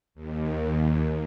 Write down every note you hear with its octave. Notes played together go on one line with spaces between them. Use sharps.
D#2